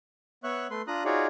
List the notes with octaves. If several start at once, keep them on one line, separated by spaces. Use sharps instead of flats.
B3 C#5 E5 C#6 F#6
A3 B4 C6
D4 F4 A#5 D#6 F#6
D#4 F4 F#4 G#4 C#5 D5